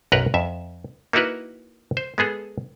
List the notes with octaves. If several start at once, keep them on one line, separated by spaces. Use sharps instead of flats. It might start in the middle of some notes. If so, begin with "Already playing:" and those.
B1 F#2 A#4 B4 F#5 A#5
F2 E5
A#3 D#4 E4 F#4 A#4 B4
C5
G#3 B3 G#4 A4